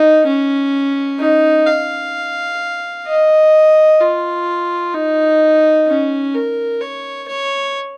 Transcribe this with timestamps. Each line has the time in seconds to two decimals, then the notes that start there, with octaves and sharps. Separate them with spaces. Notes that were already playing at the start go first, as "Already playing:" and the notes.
Already playing: D#4
0.26 C#4
1.20 D#4
1.66 F5
3.07 D#5
4.01 F4
4.94 D#4
5.88 C#4
6.34 A#4
6.81 C#5
7.28 C#5